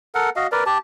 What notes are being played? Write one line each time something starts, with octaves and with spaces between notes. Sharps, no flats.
A4 A#4 F#5
F#4 D#5 F5
A#4 B4 D5
G4 A5